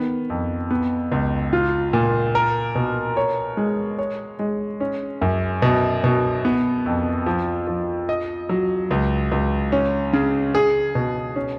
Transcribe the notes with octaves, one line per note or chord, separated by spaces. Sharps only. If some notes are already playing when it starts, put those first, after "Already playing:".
Already playing: D#3 B3
F2
B3
C#2
F4
A#2
A#4
B2
C#5
G#3
C#5
G#3
C#4
F#2
B2
B2
B3
F2
F3
F3
D#5
F#3
C#2
C#2
C#4
C#3
G#4
B2
C#4